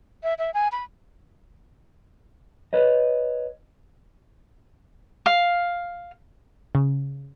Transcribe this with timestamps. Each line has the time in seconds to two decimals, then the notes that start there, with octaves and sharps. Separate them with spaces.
0.23 E5
0.39 E5
0.54 G#5
0.72 B5
2.73 B4 C#5 D#5
5.26 F5
6.75 C#3